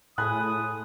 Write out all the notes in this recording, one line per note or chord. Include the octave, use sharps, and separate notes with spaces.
A2 G#4 C5 G#5 A5 B5 D#6 F#6